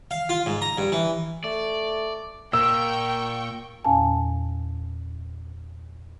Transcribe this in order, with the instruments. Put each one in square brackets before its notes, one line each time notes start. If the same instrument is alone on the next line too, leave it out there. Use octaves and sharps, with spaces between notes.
[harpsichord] F5
F4
G#2
A#5
G2
E3
[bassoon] A3 [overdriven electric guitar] D5
[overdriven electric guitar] A#2 [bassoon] A#4 [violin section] G5 C#6 [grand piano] E6
[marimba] E2 A#2 C#4 F5 G#5 A5